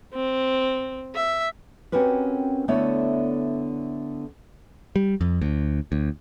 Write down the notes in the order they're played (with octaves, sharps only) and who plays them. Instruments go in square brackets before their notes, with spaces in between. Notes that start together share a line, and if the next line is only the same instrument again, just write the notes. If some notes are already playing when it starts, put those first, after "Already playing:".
[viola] C4
E5
[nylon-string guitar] C4 C#4 F#4 G4 A#4 B4
D3 A3 B3 E4 C#5 D5
[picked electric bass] G3
F2
D2
D2